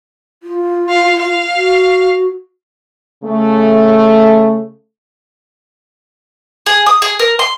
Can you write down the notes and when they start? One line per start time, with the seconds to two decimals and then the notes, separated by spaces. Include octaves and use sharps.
0.43 F4
0.90 F5
1.19 F5
1.55 F#4
3.24 C#3 A3
6.66 G#4
6.86 D#6
7.02 G#4
7.19 A#4
7.39 C6